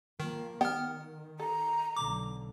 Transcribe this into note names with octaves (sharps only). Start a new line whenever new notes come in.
D#3 F3 A#3
D#3 B3 G5 F6
A4 A#5
B1 D3 D6